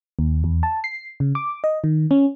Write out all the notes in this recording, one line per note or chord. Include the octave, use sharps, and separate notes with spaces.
D#2
E2
A5
C7
C#3
D6
D#5
D#3
C#4